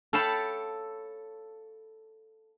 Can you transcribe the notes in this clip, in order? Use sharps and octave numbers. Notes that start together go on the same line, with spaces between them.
A4 C#5 F5 G5 A5 B5